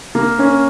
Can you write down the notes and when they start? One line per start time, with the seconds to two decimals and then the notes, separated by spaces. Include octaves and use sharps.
0.15 A#3
0.39 C#4